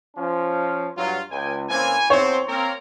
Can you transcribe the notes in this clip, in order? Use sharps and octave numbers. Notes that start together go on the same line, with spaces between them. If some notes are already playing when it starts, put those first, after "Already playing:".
F3 C#4
G2 F#3 F4
C#2 G5 G#5
C#3 E3 A#3 C4 G#5
E2 C4 C5 C#5
A#3 C4 A#4